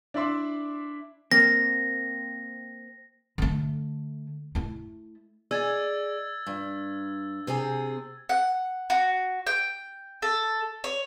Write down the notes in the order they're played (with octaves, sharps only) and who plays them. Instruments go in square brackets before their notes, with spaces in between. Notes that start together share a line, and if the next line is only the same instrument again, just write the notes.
[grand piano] D4 E4 D5 E5 C6 D6
[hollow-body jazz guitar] A#3 C4 [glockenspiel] A#6
[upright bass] D3 A3
A3 E4
[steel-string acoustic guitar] G#4 D5 D#5 [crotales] E6 G#6 A6
[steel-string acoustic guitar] G2
C3 C4 G#4
[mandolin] F#5
F#4
G5
A4
C#5